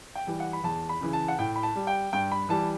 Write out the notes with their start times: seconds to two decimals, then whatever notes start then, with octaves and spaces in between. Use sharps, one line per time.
0.15 G5
0.27 E3 G3
0.40 F#5
0.53 B5
0.64 E2 A5
0.89 B5
1.01 C#3 E3
1.13 A5
1.28 F#5
1.38 A2 G5
1.56 B5
1.63 A5
1.75 G3
1.87 G5
2.13 G2 G5
2.32 B5
2.49 E3 G3 A5